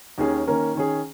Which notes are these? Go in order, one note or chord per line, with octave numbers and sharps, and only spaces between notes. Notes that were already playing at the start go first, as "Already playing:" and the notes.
D#2 D#3 C#4 G#4
D#3 A#3 C#4 A#4
D#3 C#4 G#4